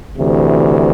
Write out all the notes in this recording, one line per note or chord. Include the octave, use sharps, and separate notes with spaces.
D2 C3 E3